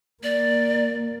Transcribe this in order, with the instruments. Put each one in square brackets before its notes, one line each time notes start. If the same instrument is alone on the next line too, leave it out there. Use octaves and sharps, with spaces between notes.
[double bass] A#3 [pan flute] D5